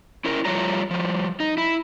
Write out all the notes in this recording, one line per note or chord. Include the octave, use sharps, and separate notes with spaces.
C#4 E4 A#4
F3 G3 A3 F4 C#5 A#5
F3 G3
D#4
E4